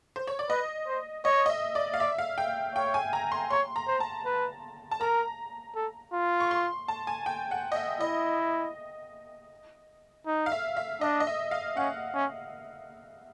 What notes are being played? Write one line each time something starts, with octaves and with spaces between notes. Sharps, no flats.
C5
C#5
D5
B4 D#5
C5
C#5 D#5
D#5
E5
D5
F5
D5 E5
F5
G5
C#5 G5
G#5
A#5
C6
C#5 C6
A#5
C5
A5
B4
A5
A#4 A#5
A4
F4
C#6
C6
A5
G#5
G5
F#5
D#5
E5
E4 D#5
D#4
F5
E5
E5
D4 D#5
D#5
E5
F5
C#4 F#5
C#4